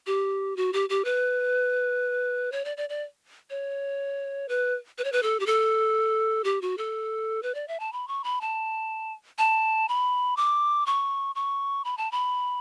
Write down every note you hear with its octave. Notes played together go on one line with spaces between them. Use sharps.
G4
F#4
G4
G4
B4
C#5
D5
D5
D5
C#5
B4
B4
C#5
B4
A4
G4
A4
G4
F#4
A4
B4
D5
E5
A5
B5
C#6
B5
A5
A5
B5
D6
C#6
C#6
B5
A5
B5